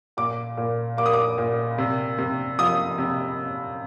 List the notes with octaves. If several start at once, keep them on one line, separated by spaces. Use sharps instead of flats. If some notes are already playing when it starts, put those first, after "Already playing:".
A#2 D6
A#2
A#3 D6
D#6
D6
A#2
C3
C3
F3 D#6
C3